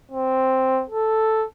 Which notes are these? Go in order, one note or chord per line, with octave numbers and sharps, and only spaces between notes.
C4
A4